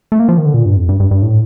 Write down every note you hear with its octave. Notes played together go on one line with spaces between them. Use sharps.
A3
A#3
F3
D#3
D3
A#2
G2
F2
G2
G2
G2
A2